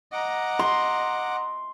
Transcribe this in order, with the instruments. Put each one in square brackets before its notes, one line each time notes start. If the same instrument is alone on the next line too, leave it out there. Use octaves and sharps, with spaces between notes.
[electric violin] D#5 A#5 [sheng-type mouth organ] F#5 D6
[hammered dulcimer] C6